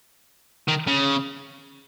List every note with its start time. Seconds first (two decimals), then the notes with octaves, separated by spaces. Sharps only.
0.68 D#3
0.87 C#3